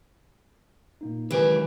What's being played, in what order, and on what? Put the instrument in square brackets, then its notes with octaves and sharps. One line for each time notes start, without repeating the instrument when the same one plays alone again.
[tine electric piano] A#2 A#3 D#4
[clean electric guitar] C#2 G4 G#5 [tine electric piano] D#3 F#3 [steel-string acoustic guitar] E3 [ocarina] B4